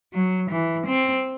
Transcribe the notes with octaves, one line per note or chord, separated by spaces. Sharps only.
F#3
E3
C4